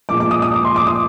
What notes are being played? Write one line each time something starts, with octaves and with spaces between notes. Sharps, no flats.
A#2 F3 G#3 D6
D6
D#6
D#6
D6
C6
D6
D#6